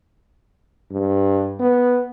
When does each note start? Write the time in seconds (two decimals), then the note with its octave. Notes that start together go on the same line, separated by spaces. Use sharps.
0.91 G2
1.60 B3